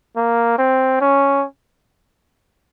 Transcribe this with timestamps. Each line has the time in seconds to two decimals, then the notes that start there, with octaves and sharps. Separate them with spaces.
0.17 A#3
0.58 C4
1.01 C#4